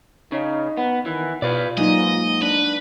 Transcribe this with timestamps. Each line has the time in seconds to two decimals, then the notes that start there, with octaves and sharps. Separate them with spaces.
0.32 C#3 D#4
0.77 B3
1.06 D#3 E3
1.42 B2 F4 B4 D5
1.77 G#2 F#3 A#3 D#4 D#5
2.42 D4 B4